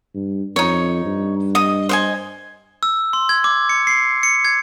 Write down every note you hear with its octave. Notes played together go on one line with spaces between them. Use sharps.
G2
F2 D#4 C#5
G2
D#5 D#6
C5 D#5 G#5
E6
C6
G#6
D6
C#7
C7
C#7
G#6